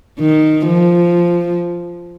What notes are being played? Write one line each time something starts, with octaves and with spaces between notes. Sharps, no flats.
D#3
F3